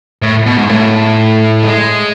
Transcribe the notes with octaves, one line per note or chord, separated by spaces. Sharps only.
A2
B2
G#2
A2
G#3